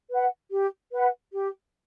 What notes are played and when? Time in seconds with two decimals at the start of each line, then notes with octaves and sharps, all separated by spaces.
0.10 B4 F#5
0.52 G4
0.92 B4 F#5
1.33 G4